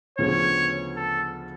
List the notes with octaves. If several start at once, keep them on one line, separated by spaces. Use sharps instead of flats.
D2 C#3 F3 B3 C#5
A4